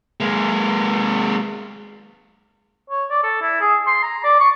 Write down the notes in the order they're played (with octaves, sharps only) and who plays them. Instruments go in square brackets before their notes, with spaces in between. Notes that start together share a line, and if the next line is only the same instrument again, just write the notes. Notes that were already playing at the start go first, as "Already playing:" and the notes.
[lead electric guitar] G#3 A#3
[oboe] C#5
D5
A4
E4
G#4
C6
A#5
D5
C#6